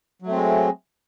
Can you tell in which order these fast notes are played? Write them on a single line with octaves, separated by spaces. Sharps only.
F#3 A3 C4 G#3